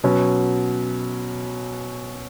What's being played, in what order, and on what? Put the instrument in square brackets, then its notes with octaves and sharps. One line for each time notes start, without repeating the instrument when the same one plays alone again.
[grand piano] B2 F#3 C#4